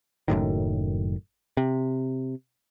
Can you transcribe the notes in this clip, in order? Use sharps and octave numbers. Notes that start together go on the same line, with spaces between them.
F#1 F#2 A2 D#3
C3